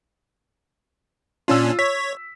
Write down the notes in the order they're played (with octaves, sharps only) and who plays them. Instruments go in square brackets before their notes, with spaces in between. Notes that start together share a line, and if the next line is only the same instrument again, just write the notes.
[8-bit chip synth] A#2 C#4 D4 [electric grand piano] F4 E6
[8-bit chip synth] C#5 [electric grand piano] B6